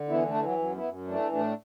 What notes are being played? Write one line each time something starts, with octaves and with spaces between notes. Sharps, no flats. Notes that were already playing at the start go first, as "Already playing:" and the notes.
Already playing: D3
E3 B3 E4
A3 D4
E3
F#3
F#2 F#3
B3 E4
F#2
E3 A3 D4
A2 A3 D4